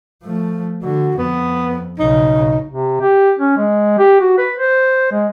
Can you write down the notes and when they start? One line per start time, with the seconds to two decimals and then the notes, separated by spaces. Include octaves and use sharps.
0.23 F3 A3
0.83 D3 F#4
1.18 F2 B3
1.99 B1 C#3 D#4
2.71 C3
3.01 G4
3.39 C#4
3.57 G#3
3.99 G4
4.21 F#4
4.38 B4
4.58 C5
5.12 G#3